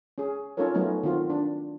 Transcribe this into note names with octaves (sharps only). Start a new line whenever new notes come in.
C#4 G#4
C#4 D#4 F4 A4 A#4 C#5
F#3 A3 B3 C#4 D#4
D#3 C4 F4 F#4
D4